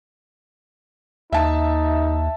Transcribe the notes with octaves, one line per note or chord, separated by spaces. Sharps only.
D#2 D#4 E5 A5